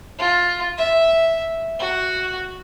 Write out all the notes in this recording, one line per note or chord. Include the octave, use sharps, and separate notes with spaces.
F4
E5
F#4